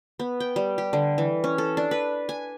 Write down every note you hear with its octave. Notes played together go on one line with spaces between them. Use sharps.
B3
G5
G3
G4
D3
E3
C#4
A4
D4
B4
G#5